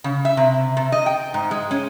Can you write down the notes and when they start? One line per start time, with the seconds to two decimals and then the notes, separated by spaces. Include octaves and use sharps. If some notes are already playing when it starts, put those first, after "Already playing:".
0.04 C#3
0.25 E5
0.37 C3
0.77 C3
0.92 D#5
1.06 G5
1.34 G#2
1.51 G#3
1.71 C#4